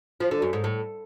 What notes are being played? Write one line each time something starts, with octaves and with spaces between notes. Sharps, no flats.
F3
D3
F#2
G#2
A2